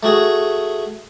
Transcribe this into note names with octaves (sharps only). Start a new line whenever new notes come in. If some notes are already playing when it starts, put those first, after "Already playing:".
A3 F#4 G#4